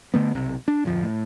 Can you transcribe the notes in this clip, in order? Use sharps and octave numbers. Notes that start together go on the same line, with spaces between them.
D3 A3 B3
B1 C3
D4
D1 F2 F3
A2